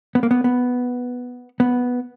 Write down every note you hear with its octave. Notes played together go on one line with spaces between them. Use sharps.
B3
A#3
B3
B3
B3